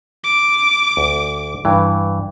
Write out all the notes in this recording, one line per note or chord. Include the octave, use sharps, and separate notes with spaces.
D6
D2
G2 E3